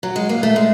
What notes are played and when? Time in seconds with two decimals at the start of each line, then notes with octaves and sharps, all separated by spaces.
0.03 F#3
0.16 G#3
0.29 A#3
0.43 A3
0.56 G#3